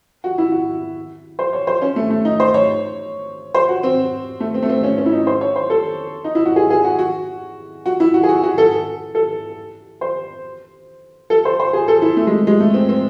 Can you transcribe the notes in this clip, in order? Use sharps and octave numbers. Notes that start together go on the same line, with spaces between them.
F#4
E4
F#4
C5
C#5
C5
C#4
A3
A3
D#4
C5
C#5
C5
F#4
C4
A3
C4
A3
C4
C#4
C#4
E4
D#4
C5
C#5
C5
A4
D#4
E4
F#4
G#4
G#4
F#4
F#4
F#4
E4
F#4
G#4
F#4
F#4
A4
A4
C5
A4
C5
C5
G#4
A4
E4
A3
G#3
G#3
A3
C4
C4